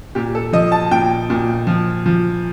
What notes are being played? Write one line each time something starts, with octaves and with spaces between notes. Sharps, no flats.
A#2 G4
A4
F3 D#5
A5
A#2 G5
A#2
F3
F3